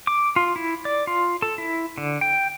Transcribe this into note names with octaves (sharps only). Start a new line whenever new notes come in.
D6
F4
E4
D5
F4
A4
E4
D3
G5